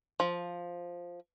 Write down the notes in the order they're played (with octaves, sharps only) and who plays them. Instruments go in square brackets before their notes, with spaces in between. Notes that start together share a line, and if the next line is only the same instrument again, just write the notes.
[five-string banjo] F3